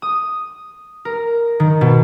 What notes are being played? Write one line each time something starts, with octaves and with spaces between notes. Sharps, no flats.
D#6
A#4
D#3
B2